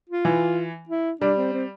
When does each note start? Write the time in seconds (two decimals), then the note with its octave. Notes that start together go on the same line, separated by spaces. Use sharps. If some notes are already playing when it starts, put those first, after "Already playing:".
0.10 F4
0.25 E3
0.89 E4
1.21 G3 D4
1.37 C4
1.53 C4